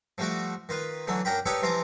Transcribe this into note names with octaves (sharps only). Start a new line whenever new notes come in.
F3 G3 A3 F#4 D6
D#3 F4 B4
D3 E3 F#3 A3
F#2 D4 A#4 G5 B5
D#4 G4 A4 B4 C#5 D5
C3 E3 F3 F4 A#5 D6